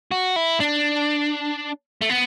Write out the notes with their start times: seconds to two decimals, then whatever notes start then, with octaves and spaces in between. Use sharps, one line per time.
0.11 F#4
0.36 E4
0.60 D4
2.01 A3
2.09 B3